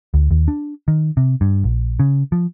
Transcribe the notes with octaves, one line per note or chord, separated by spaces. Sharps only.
D2
D#2
D4
D#3
C3
G2
A#1
C#3
F3